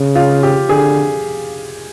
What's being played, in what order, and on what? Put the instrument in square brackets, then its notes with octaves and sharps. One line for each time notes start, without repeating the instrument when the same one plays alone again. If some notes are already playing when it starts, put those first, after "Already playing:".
Already playing: [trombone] C#3
[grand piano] F4
G4
[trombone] D3 [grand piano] G#4